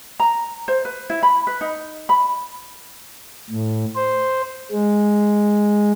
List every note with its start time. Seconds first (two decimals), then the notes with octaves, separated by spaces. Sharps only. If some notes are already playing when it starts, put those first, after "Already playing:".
0.20 A#5
0.68 C5
0.85 B4
1.10 E4
1.23 B5
1.47 B4
1.61 D#4
2.09 B5
3.50 A2
3.96 C5
4.72 G#3